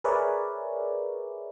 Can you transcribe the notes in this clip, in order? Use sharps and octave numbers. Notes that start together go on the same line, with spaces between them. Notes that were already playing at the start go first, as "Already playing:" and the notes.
G#4 A#4 B4 C#5 D5 E5